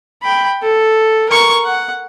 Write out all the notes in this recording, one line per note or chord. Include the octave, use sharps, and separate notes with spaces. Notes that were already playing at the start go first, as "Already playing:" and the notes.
G5 B5
A4
A#4 C#6
F#5